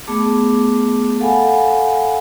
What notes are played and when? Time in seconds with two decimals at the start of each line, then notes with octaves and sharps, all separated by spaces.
0.07 A3 B3 G#4 A5 D6
1.19 A4 F5 F#5 G#5 B5